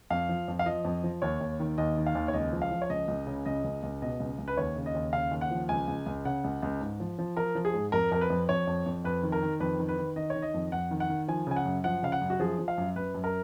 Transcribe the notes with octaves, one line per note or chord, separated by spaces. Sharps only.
F2 F5
F3
F2
F5
F3 D#5
F2
F3
D#2 C#5
D#2
D#3
D#2 D#5
D#3
F5
D#2
C#5
C#2 D#5
F3
F5
F3
C#5
C#2 D#5
C#2
C#3
C#2 D#5
C#2
C#2
B2 D#5
C#2
C#2
B4
D#2 C#5
C#3
D#5
D#2
C#3 F5
D#2
F#5
F3
C#2 G#5
C#2
C#2
C#3 F#5
C#2
C#2
G#2
F3
F3
F3 A#4
F3
G#4
G#2
F2 A#4
F2 A#4
B4
F2
F2 C#5
F2
F2
F2 B4
D#3
A#4
D#3
F2 B4
D#3
B4
D#3
D#3 D#5
C#5
D#3
D#5
F2
F2 F#5
D#3
F#5
D#3
F3 G#5
C#3 G#5
F#5
F#2
F3 F#5
C#3 F5
F#5
F#2
F#4
F3 G#4
F3
F5
F#2
F#2 B4
F#2
A#4